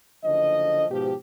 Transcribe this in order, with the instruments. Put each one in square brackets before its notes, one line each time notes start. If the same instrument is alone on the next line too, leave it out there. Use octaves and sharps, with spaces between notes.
[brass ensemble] F#1 D3 F3 D#5
G#2 B2 F3 G4